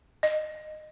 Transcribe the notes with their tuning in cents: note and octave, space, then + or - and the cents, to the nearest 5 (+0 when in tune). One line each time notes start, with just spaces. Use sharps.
D#5 -15